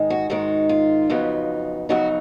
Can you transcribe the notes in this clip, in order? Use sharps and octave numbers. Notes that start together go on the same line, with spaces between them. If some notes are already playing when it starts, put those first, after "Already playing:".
Already playing: G#2 D#3 G#3 D#4
F#4
G#2 D#3 G#3 D#4 F#4
F4
F2 C#3 F#3 B3 D#4
F2 C#3 F#3 B3 D#4 F#4